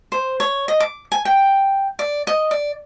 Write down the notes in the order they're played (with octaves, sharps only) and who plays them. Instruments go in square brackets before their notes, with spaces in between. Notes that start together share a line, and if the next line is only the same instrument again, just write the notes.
[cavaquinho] C5
C#5
D#5
D6
G#5
G5
D5
D#5
D5